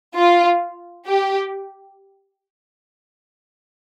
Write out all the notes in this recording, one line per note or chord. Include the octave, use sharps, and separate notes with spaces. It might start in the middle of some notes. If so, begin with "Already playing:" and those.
F4
G4